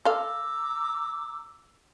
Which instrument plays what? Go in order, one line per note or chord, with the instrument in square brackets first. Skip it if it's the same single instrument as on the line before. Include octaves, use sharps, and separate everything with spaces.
[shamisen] A4 F5 [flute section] A#5 D6 E6